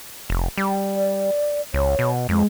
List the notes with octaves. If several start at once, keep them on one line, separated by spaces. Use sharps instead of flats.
F1
G3
D5
C#2 C#5
B2
F2 G#3